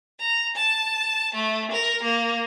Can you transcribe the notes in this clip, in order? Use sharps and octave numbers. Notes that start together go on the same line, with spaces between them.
A#5
A5
A3
A#4
A#3